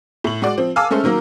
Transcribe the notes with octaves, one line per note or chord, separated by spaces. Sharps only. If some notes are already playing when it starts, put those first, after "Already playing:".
A2 F#7
G#3 F#4 D5
F3 C4
F5 G#5 A5 D6 E6 F6
G#3 A3 C#4 A4 C5
D#3 F#3 A#3